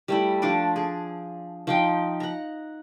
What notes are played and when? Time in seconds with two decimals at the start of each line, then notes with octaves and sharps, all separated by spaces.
0.08 G3 A3 E4
0.42 F3 D4 D5
0.76 G#4
1.67 F3 D#4 G5
2.20 F#5 A#5